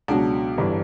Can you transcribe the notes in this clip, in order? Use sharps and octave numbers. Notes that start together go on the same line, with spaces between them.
C#2 B2 F#3 D4
G1 G2 E3